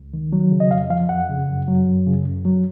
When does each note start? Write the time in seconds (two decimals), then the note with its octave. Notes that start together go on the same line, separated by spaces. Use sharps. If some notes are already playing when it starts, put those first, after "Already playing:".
Already playing: C#2
0.14 D#3
0.33 F#3
0.51 C#3
0.60 D#5
0.71 F2 F5
0.90 F3 F5
1.09 F2 F#5
1.29 C#3
1.49 F#2
1.68 F#3
1.87 F#2
2.07 C#3
2.26 F#2
2.45 F#3